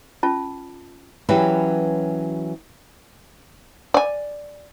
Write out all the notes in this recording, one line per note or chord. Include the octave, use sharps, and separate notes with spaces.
C#4 F4 A5
E3 F#3 C#4 F#4 G4 B4
D5 G#5